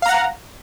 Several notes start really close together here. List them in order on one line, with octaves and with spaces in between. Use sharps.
F5 A#5 F#5